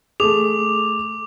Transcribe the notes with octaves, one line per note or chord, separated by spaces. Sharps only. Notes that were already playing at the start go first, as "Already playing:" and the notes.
A3 G#4 D6 F7